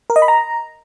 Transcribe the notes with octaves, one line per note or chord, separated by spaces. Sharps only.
A#4
D#5
B5
A#5